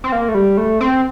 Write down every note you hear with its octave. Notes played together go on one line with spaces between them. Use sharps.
C4
A#3
A3
G3
A3
C4